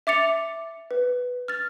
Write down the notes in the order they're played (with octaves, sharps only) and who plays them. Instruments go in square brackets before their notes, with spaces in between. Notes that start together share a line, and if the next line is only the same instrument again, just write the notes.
[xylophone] E5 D6 A6 C#7 F7
B4
F6 A6